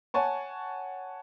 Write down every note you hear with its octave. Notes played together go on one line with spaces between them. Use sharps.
C#5 F#5 G#5 A5 C#6